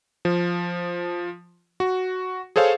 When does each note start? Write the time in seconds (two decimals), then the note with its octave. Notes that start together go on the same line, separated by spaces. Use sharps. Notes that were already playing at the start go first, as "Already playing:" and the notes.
0.25 F3
1.80 F#4
2.56 G#4 A4 C5 C#5 F5